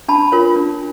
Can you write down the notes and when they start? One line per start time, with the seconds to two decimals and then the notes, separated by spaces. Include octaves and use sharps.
0.08 D4 A5 B5
0.32 F4 A#4 C#5
0.56 D4